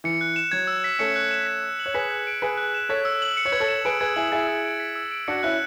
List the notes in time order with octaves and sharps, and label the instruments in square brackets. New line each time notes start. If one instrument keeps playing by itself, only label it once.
[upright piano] E3 [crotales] C#7
[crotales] F#6
E7
[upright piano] F#3 [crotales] G#6
[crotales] E6
B6
[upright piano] A3 C#4 [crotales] C#7
[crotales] F#6
E7
B6
E6
F#7
[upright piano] C#5
[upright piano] G#4 B4 [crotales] B6
[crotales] F#6
D7
[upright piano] G#4 B4 [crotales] B6
[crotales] F#6
E7
[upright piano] A4 C#5 [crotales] B6
[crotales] E6
F#7
C#7
[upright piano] C#5
[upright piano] B4 [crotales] G#6
[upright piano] A4 C#5
[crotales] E7
[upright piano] G#4 B4 [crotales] D7
[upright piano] G#4 B4 [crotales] G#6
[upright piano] E4 G#4 [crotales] F#7
[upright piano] E4 G#4 [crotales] A6
[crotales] E6
D7
B6
E6
D7
[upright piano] D4 F#4 [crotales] C#7
[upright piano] C#4 E4 [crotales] F#6